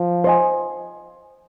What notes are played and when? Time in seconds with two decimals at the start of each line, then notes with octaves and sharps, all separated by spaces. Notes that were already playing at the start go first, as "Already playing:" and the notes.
Already playing: F3
0.24 C5 D#5 G#5